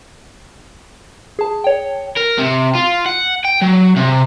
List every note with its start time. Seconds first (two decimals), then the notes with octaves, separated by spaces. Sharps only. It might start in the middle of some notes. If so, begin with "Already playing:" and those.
1.39 G#4 A5
1.64 C#5 G5
2.16 A#4
2.38 C3
2.75 F4
3.06 F#5
3.45 G5
3.62 F#3
3.97 C3